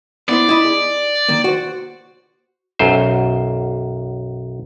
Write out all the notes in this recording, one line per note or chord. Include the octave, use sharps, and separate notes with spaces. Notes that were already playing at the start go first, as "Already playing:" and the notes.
B3 E4 C5 D5
E4 D#5 B5
G#4
D#3 A#3
F#4 C5
B1 F#2 C5